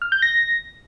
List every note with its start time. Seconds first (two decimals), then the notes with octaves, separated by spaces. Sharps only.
0.02 F6
0.12 G6
0.22 A#6